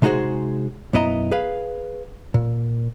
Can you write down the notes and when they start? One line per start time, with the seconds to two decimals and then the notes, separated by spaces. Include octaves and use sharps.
0.02 C3 G#3 D#4 F#4 G#4 C5
0.93 B1 F#2 B3 E4 D#5 A#5
1.31 G#4 B4 F5
2.34 A#2